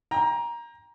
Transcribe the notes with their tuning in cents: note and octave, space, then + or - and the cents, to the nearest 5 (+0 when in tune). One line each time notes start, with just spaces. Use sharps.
G5 +35 A#5 +15